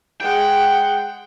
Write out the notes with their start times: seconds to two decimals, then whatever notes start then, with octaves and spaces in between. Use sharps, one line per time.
0.20 G#3 F#5 G5